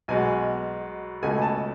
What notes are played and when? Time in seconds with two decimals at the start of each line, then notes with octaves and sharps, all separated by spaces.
0.08 B1 B2 G#3 G#5
1.23 C#2 B2 A3 G#5
1.42 A5